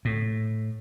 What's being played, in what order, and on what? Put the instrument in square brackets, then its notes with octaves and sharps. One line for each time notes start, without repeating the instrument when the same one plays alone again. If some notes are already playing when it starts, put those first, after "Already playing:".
[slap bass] A2